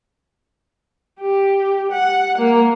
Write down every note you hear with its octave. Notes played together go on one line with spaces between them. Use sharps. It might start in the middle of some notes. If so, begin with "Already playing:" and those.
G4
F#5
A#3